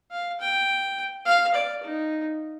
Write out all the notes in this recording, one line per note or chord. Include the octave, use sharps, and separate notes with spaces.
F5
G5
F5
D5
D#4